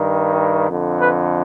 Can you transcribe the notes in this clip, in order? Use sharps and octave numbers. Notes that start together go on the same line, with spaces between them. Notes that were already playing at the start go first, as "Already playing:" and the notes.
Already playing: G2 D#3
F2 D3
B4